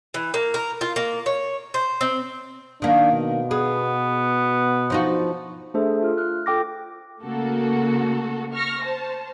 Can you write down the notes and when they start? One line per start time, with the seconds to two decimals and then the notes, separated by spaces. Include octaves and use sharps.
0.14 E3
0.34 A#3
0.54 A#4
0.81 F4
0.96 A#3
1.26 C#5
1.74 C5
2.01 C4
2.82 D#3 A#3 D4
3.12 B2
3.51 B3 G#4
4.90 F3 D#4 F#4
5.74 A3 D4 G#4 A4 C5 E5
6.03 F4 F6
6.17 F6 F#6
6.46 F4 A4 G5 D6 A#6
7.22 C#3 A3 A#3 F#4 A4
8.53 C#6 F6 A#6
8.84 C5 A5